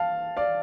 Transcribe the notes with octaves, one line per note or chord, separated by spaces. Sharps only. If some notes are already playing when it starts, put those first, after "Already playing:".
Already playing: F5 A5
D5 F5